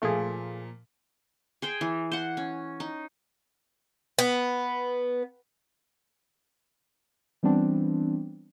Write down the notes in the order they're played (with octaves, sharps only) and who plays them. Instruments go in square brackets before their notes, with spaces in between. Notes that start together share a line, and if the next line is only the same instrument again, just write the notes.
[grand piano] A#2 F3 A#3 [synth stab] A3 G#4
[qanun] G#4 C5 G5
E3
C5 F#5
C#4
D#4
[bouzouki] B3
[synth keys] E3 G3 B3 C4 D4